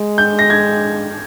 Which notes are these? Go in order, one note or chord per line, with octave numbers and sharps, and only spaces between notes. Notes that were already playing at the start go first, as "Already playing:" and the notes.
Already playing: G#3
G6
A#6
G#6